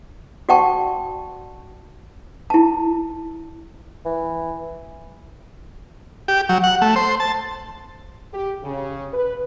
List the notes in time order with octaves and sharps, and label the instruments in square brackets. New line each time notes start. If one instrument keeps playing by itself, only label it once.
[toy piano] F#4 D5 F#5 G5 A5 C#6
E4 A5
[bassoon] E3
[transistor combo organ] G4
F#3
F#5
A3
C5
A5
[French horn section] G4
C#3
B4